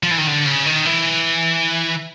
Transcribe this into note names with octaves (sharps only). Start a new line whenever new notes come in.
F3
E3
D#3
D3
C#3
D#3
E3